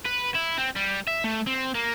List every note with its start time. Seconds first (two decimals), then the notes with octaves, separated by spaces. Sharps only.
0.06 B4
0.35 E4
0.58 C4
0.76 G3
1.07 E5
1.24 A3
1.47 C4
1.75 A#3